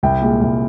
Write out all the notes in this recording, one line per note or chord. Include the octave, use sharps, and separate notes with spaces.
C2 G5
A#2 G#3
C2